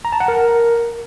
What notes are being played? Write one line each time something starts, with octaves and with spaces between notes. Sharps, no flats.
A#5
A5
F#5
A#4